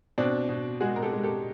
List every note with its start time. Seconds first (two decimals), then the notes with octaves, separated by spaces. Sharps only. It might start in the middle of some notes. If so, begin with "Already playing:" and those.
0.18 B2 C4 D4
0.49 B2
0.81 G#3 F#4 G#4
0.96 A#4
1.02 G4 A4
1.13 G#3
1.23 G4 A4